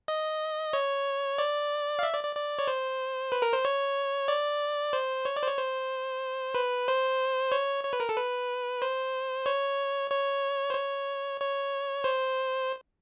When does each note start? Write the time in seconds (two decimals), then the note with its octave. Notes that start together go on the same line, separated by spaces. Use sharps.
0.08 D#5
0.73 C#5
1.38 D5
1.99 F5
2.03 E5
2.13 D5
2.24 D5
2.35 D5
2.59 C#5
2.68 C5
3.32 B4
3.42 A#4
3.53 C5
3.65 C#5
4.28 D5
4.93 C5
5.25 C#5
5.36 D5
5.42 C5
5.47 C#5
5.58 C5
6.54 B4
6.88 C5
7.52 C#5
7.84 C#5
7.93 B4
8.00 A#4
8.09 A4
8.16 B4
8.82 C5
9.46 C#5
10.10 C#5
10.70 C5
10.75 C#5
11.40 C#5
12.04 C5